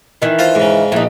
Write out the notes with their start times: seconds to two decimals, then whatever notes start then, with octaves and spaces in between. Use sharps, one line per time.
0.22 D#3 E3
0.39 F4 C5
0.55 G#2 C#3
0.92 A#1 E3 D#4